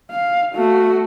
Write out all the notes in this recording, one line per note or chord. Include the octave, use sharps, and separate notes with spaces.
F5
A3 F#4